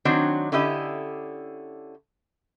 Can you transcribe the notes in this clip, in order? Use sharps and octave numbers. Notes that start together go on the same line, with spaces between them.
D#3 F#3 C4 D4
D3 C#4 E4 G4 D#5